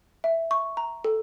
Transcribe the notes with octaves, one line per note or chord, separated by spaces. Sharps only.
E5
C#6
A#5
A4